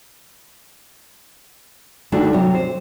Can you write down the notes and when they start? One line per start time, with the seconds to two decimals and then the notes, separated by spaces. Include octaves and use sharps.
2.12 D2 D#3 A3 D4 E4 F#4
2.33 C3 F#3
2.55 C5